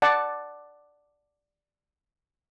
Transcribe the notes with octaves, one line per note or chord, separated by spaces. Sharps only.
D5 F#5 A5